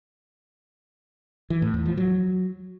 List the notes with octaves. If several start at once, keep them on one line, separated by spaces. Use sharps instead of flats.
E3
A2
E2
F3
F#3